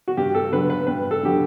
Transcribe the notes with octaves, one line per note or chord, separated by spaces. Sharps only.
F#4
G2 G4
A4
D3 F#3 B4
B4
G2 B4
A4
D3 F#3 G4